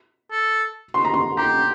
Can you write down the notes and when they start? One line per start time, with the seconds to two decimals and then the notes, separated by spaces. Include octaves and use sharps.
0.32 A4
0.94 C6
1.05 A#5
1.14 C6
1.37 G4 A#5